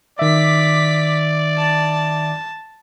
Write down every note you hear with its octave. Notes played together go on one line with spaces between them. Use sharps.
D#3 D5 E5 D6 B6
A5